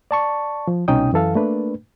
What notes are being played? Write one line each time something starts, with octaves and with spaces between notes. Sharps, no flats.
D5 A5 C#6
F3
C2 B2 C#4 D#4 G5 D#6
F#2 E3 A4 F5
A3 A#3 D4 B4